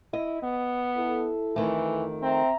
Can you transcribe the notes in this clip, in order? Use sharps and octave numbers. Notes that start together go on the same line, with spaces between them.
E4 D#5
B3
E4 A4
F2 D#3 E3 A3
C4 E5 A#5